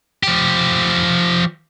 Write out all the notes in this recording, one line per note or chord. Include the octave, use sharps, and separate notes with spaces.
F3 G4